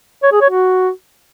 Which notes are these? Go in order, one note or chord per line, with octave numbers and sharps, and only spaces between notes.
C#5
G#4
C#5
F#4